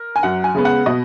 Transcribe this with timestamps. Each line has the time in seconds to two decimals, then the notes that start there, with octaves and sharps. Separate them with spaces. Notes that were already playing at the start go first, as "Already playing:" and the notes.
Already playing: A#4
0.16 G#5
0.23 F#2 F#5
0.44 G#5
0.55 C#3 G#3 B3
0.65 F#5
0.86 B2 D#5